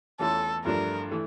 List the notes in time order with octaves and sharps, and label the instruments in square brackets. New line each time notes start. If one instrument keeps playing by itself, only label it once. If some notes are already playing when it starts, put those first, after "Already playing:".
[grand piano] E2 E3 A3 C#4 F4 [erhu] A4
[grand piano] G2 F3 A3 D4 [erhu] A#4
[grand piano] E3 A3